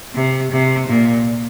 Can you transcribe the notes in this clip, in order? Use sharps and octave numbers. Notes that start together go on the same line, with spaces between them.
C3
C3
A#2